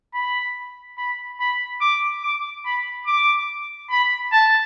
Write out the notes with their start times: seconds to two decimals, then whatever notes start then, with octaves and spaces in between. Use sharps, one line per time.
0.14 B5
0.98 B5
1.40 B5
1.81 D6
2.23 D6
2.65 B5
3.07 D6
3.90 B5
4.32 A5